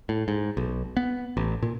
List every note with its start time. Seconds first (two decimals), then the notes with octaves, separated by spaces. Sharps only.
0.09 A2
0.28 G#2
0.57 B1
0.97 B3
1.37 A1
1.63 A#2